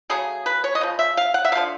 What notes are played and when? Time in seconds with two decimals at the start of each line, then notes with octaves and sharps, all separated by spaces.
0.10 C#3 F#3 A3 G#4
0.46 B4
0.64 C#5
0.75 D#5
0.81 C#3 F3
0.99 E5
1.17 F5
1.34 F#5
1.45 E5
1.52 A#3 F5
1.55 D3 F3